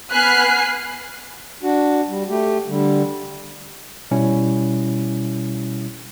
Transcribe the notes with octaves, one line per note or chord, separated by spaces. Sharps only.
B3 G#5 B5 F6 F#6 C7
D4 F#4
G3
A3 G4
D3 G3
B2 G3 C#4 E4